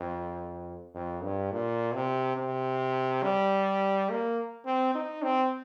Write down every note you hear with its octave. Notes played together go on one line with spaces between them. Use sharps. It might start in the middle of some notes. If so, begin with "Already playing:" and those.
Already playing: F2
F2
G2
A#2
C3
C3
G3
A#3
C4
D#4
C4